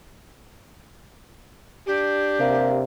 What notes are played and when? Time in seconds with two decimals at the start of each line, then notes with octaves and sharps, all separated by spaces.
1.86 D4 G4
2.40 C3 A#3